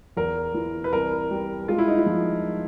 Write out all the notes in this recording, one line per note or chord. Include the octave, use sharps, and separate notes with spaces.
E2 A#4
E3
B4
C2 A#4
G3
G#3 F4
E4
D#4
E4
F3